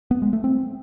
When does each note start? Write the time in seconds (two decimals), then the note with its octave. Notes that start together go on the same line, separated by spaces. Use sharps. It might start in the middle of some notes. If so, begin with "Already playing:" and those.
0.11 B3
0.22 G#3
0.33 A3
0.44 C4